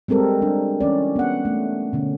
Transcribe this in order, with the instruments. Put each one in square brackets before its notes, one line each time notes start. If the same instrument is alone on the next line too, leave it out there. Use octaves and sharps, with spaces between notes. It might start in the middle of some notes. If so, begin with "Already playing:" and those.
[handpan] G3 G#3 C4 A4 A#4
G3 D4
E3 C#4 D5
B3 F#5
A3
B2 D3 C#4